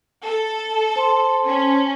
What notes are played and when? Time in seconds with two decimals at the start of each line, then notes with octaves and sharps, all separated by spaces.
0.23 A4
0.96 C5 A5 C6
1.46 C#4